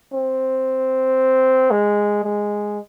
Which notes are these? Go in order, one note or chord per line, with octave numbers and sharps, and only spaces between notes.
C4
G#3
G#3